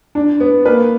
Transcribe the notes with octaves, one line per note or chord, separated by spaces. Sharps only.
D4
B3
A#3 B4